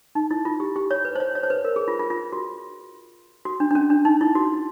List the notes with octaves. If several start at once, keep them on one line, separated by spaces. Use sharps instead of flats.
D#4
E4
F4
G4
G4
C#5
B4
C5
C#5
C#5
C5
B4
A#4
G#4
F4
F4
F4
F#4
F#4
D4
D4
C#4
D4
D#4
E4
F#4